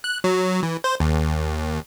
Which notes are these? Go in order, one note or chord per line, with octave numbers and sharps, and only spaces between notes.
F#6
F#3
E3
C5
D#2